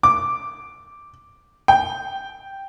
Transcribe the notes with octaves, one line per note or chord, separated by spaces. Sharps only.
D6
G5